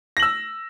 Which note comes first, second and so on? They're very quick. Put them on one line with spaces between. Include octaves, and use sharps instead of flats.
A#6 F#7 E6